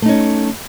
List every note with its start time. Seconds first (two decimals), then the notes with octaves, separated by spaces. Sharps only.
0.02 A3
0.06 D#4
0.09 C#4